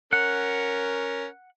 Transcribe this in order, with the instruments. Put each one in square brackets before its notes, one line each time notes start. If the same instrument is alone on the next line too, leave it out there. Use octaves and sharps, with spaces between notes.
[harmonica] C#4 A#4 [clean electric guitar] F#5